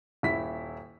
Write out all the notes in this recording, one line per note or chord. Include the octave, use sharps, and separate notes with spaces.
D#1 E4 B6